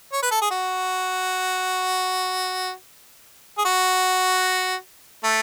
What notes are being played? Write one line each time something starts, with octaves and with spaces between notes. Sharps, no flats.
C#5
B4
A4
G#4
F#4
G#4
F#4
A3